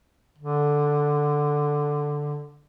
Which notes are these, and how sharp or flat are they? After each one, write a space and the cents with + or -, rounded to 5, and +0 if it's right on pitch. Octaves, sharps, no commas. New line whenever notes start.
D3 +0